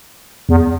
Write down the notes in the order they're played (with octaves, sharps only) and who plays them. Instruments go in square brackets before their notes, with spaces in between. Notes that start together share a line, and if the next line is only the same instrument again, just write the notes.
[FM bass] E2